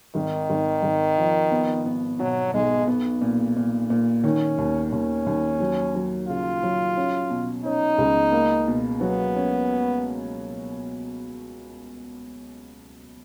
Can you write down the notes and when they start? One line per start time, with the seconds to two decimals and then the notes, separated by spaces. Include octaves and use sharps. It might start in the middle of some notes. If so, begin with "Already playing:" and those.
0.15 G#1 D#3
0.50 G#1
0.83 G#1
1.18 F3
1.52 B3
1.85 B3
2.19 B2 F#3
2.54 B1 G#3
2.88 B3
3.21 A#2
3.56 A#2
3.90 A#2
4.24 D#3 C#4
4.58 D#2
4.92 D#2 C#4
5.26 D#2
5.60 F#3
5.95 F#3
6.28 C#3 F4
6.63 F#3
6.97 C#4
7.30 B2
7.64 C#4 D#4
7.98 C#2
8.32 A#3
8.68 B2
9.01 F#3 B3
9.36 C#4